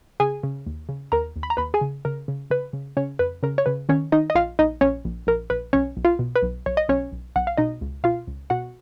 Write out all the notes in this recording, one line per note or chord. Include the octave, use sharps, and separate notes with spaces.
C#3 G#4 G#5
C#3
D#2
C#3
D#2 A#4 A#5
D#2
B5
A#5
D#2 B4 B5
G#4 G#5
C#3
C#3 A#4
C#3
C#3 B4
C#3
C#3 C#4 C#5
F2 B4
C#3 A#4
C#5
C#3 B4
D#3 C#4 C#5
D#3 D#4 D#5
D#5
A#1 F4 F5
A#1 D#4 D#5
A#1 C#4 C#5
A#1
A#1 A#4
A#1 B4
B1 C#4 C#5
B1
F4 F5
B2
B4
B1
B1 C#5
D#5
B1 C#4 C#5
B1
B1 F#5
F5
B2 D#4 D#5
C#2
B2 F4 F5
C#2
B2 F#4 F#5